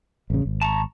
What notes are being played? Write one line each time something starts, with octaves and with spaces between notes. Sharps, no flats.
A1 C#3
G#1
A5 A#5 C#6